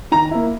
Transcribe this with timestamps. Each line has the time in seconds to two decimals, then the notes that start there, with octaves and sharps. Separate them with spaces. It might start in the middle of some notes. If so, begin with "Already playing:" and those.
0.12 D#3 A#5
0.31 A#3 E4